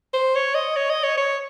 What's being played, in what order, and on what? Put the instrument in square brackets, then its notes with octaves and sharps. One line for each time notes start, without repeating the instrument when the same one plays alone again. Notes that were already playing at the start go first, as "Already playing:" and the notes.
[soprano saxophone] C5
C#5
D#5
C#5
D#5
C#5
C#5